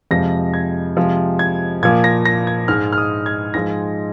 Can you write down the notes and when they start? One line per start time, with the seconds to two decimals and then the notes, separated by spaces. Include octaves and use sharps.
0.11 F2 C3 F3 G#3 A#6
0.54 G#6
0.97 C3 F3 G#3
1.39 G#6
1.83 A#2 F3 A#3 G#6
2.04 A#6
2.25 A#6
2.47 G#6
2.68 G#2 G#3 F6
2.93 F6
2.98 D#6
3.26 G#6
3.54 G#2 F3 G#3 A#6